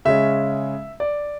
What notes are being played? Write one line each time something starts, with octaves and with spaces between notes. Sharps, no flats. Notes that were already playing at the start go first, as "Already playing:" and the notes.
C#3 G#3 C#4 E5
D5